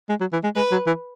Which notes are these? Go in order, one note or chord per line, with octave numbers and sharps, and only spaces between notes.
G#3
F#3
E3
G#3
G#3 B4
F#3
E3